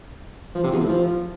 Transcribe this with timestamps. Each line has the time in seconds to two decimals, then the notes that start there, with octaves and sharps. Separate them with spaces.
0.55 F3
0.63 C3
0.72 E2
0.80 A2
0.89 F3